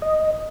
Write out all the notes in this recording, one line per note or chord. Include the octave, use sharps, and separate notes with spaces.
D#5